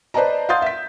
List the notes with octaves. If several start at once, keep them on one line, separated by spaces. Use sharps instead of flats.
B4 C5 D5 D#5 A5 A#5
F5 F#5 C6 D#6 G6 A6
E5 B6